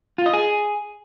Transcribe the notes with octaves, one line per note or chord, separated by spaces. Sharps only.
F4
D#5
G#4